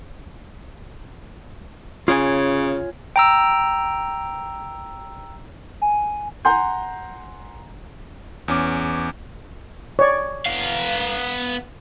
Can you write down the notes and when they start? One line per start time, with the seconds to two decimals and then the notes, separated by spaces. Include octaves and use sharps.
2.08 C#3 F4 C#5 G#5
3.16 G5 A#5 E6
5.82 G#5
6.45 F#5 G#5 A#5 C6 G6
8.48 E2 C#4 D6
9.99 C#5 D5
10.46 B3 F5